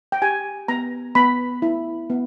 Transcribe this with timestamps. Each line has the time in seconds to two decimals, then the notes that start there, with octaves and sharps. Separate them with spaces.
0.12 G5
0.22 G4 G#5
0.68 B3 A#5
1.15 B3 B5
1.62 E4
2.10 B3